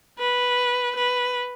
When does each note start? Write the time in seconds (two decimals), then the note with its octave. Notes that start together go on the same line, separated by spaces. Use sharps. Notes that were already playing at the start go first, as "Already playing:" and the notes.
0.19 B4
0.96 B4